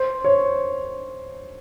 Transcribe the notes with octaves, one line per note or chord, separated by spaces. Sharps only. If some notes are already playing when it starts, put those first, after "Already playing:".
Already playing: C5
C#5